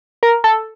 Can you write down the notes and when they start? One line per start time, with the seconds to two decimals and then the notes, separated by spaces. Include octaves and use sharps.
0.23 A#4
0.44 A4